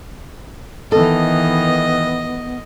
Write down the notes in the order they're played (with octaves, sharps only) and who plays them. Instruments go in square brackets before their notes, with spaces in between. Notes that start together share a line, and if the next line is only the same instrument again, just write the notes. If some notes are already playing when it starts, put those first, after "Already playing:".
[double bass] D#3 E3 [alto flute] B3 [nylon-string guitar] A4 [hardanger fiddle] D#5